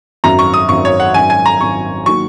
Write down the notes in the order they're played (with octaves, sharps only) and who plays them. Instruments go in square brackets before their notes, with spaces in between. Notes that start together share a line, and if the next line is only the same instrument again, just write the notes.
[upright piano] G#1 F#2 F#3 [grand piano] A#5
[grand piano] C#6
D#6
[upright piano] G#1 F#2 F#3 [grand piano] C#6
[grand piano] C#5
F#5
[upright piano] G#1 F#2 F#3 [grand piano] G#5
[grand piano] G#5
A#5
[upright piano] G#1 F#2 F#3 [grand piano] C#6
[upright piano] D#3 F#3 A#3 F#4 [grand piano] C#6